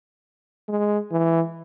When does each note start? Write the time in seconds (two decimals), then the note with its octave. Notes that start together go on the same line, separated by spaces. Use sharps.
0.68 G#3
1.11 E3